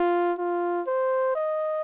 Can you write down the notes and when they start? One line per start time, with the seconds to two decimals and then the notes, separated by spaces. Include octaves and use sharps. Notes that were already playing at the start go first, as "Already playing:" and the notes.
Already playing: F4
0.38 F4
0.87 C5
1.36 D#5